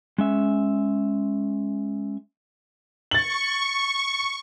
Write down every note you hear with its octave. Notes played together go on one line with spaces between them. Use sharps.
G#3 C#4 E5
C#6 A6 F#7